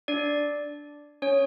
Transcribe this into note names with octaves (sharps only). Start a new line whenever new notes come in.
D4 D5
C#4 C#5